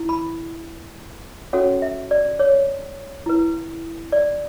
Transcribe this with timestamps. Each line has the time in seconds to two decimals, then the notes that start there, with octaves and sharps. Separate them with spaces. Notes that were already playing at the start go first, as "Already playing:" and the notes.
Already playing: E4
0.09 B5
1.53 C#4 F#4 A4 C#5 F#5
1.82 E5
2.11 D5
2.39 C#5
3.26 E4 B4
4.12 D5